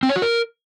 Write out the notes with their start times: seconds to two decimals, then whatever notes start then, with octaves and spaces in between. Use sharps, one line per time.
0.03 C4
0.09 C#5
0.16 F#4
0.22 A#4